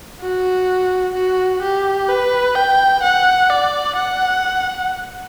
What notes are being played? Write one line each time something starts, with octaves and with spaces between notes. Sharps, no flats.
F#4
F#4
G4
B4
G5
F#5
D5
F#5